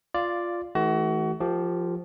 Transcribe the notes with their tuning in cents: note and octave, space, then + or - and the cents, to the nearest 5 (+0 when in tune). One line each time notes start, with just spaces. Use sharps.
F4 +0 D5 +0 F5 -15
E3 -40 A3 -25 F#4 +30
F3 +0 G4 +0 A#4 -40